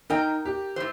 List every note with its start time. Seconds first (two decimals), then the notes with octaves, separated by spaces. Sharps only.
0.10 D#4 A#4 D#5 G5
0.45 G4
0.76 A2 C5